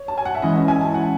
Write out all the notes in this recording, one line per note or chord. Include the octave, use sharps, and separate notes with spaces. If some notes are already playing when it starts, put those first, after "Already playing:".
Already playing: C#5
A5
G#5
F#5
E5
E3 G#3 C#4 E4 D#5
E5
G#5
A5
F#5